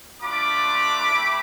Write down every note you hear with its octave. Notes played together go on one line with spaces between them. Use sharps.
A3 D4 F4 B5 D6
A3 C4 E4